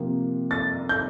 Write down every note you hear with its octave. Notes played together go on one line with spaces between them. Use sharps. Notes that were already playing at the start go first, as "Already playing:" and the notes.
Already playing: C3 F3 A#3
A6
G6